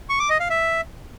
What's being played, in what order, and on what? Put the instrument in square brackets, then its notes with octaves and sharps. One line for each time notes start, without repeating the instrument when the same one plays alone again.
[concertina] C#6
D6
D#5
F5
E5